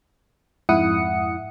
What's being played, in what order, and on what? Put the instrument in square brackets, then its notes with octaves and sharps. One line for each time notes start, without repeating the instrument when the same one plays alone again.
[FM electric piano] F2 G#2 E4 F#5 D#6 C#7